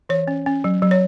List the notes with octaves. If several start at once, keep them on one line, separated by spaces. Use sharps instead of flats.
E3 C#5
C#4
C#4
F#3
F#3
C#5